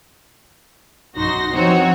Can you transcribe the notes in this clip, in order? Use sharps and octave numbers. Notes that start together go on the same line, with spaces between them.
B1 F#2 D#4 F#4 C6 A#6
E3 F3 C4 D#4 F#4 C#5